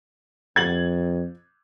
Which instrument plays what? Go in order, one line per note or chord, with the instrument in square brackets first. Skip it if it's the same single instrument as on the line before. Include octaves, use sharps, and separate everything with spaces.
[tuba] F2 [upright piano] G#6 A6 F#7